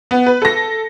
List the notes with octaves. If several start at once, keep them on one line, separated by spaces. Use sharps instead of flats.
B3
B4
A4 A#6